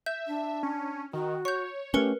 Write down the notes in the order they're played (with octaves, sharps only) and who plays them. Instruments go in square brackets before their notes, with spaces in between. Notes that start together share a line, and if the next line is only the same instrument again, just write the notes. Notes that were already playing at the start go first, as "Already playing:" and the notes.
[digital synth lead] E5 [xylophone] G6
[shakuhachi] D4
[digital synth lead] C#4
[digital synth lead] D#3 [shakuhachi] F#4
[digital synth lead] C#5 [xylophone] C#6 G6
[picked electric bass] A3 C#4 [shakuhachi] G4 [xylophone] A#4 B4 C#7